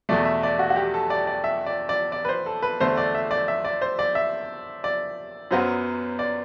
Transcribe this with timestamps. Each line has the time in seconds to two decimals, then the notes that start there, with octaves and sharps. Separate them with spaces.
0.09 E2 B2 A3 D5
0.25 E5
0.43 D5
0.59 F#4
0.70 F#4
0.76 G4
0.94 A4
1.10 D5
1.27 D5
1.44 E5
1.66 D5
1.89 D5
2.12 D5
2.25 B4
2.29 C5
2.46 A4
2.62 B4
2.80 E2 D3 A3 C5
2.97 D5
3.15 E5
3.31 D5
3.48 E5
3.65 D5
3.81 C5
3.99 D5
4.15 E5
4.84 D5
5.51 F#2 F#3 B3 C5
6.19 D5